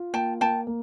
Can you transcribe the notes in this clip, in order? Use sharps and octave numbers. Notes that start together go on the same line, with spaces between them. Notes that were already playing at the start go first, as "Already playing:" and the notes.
Already playing: F4
A#3 G5 A5
A#3 G5 A5
A#3